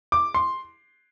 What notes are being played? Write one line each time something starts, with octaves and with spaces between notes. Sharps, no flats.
D6
C6